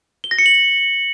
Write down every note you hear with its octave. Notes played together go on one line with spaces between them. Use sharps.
G7
A#6
C#7
F#7